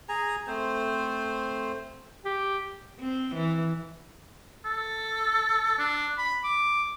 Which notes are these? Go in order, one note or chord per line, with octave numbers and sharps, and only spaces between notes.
G#4 G#5 A#5
A3 C4 C5
G4
C4
E3
A4
D4
B5
D6